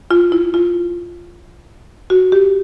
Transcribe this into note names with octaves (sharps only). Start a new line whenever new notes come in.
F4
E4
F4
F#4
G4